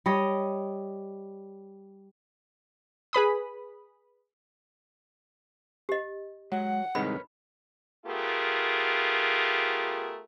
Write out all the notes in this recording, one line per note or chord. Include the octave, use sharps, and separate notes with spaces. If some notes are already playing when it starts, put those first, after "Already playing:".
G3 C#5 D#5
G#4 B4 B5 D#6
G4 D#5
F#3 G#3 F#5
C2 G#2 D#3 A#4 B4 C#5 B5
A3 B3 F4 G4 G#4 A#4